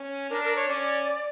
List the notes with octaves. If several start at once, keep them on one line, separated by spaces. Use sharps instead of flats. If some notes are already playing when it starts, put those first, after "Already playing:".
Already playing: C#4
D4 A#4
A#4
C#5
C#4 D5